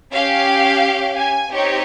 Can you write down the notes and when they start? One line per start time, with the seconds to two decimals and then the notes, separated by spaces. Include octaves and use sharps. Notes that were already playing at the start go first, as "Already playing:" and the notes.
0.13 C#4 G4 F5
1.17 G#5
1.52 C4 D#4 G4 C#5